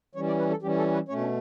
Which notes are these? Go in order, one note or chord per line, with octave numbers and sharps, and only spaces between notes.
E3 G3 C#4 C#5
D5
B4
A4
E3 G3 C#4 G4
A4
B4
B2 A3 C#4 C#5
D4